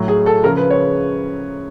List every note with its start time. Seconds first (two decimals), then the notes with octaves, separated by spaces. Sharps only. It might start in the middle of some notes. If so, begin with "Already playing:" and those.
Already playing: A2 F#3
0.08 G#4
0.26 A4
0.44 C#3 F3 A#4
0.57 B4
0.70 C#5